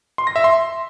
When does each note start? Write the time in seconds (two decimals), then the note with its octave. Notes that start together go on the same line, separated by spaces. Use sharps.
0.18 C6
0.27 A#6
0.36 E5
0.44 C6